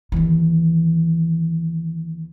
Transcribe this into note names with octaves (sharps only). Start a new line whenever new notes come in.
D#2 E3